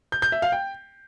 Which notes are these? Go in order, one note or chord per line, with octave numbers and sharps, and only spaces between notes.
G6
G6
E5
F5
G5